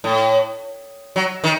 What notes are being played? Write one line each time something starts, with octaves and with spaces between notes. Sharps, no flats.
A2
F#3
D#3